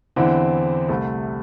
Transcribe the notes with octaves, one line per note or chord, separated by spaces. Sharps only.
E2 D3 C4 E4
C2 C3 A3